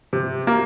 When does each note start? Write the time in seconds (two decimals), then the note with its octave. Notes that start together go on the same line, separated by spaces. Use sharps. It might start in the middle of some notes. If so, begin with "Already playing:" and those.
0.13 C3
0.47 A#3